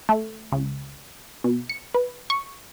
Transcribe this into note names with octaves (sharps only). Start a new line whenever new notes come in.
A3
C#2
B2
C#7
B4
C#6